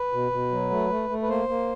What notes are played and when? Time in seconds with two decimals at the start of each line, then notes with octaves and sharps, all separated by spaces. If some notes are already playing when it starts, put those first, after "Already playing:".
Already playing: B4
0.12 B2
0.32 B2
0.51 F#3
0.70 A3
0.90 A3
1.10 A3
1.22 B4
1.29 A#3 C5
1.48 A#3